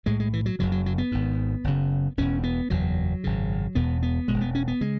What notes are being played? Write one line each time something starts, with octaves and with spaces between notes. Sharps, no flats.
B1 A2 G#3
G#3
E3
F#3
F#1 F#2 C#3 F#3
F#3
F#3
B3
G#1 G#2
F#1 F#2 C#3
E1 E2 B2 C#4
B3
F#1 E2 B2 F#3
G#1 F#2 C#3
E1 E2 B2 B3
B3
E2 B2 G#3
E1
B3
C#4
B3
C#3 G#3